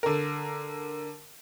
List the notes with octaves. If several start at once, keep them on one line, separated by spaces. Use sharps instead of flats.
D3 A#4